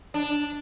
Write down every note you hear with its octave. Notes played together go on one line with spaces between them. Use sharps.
D4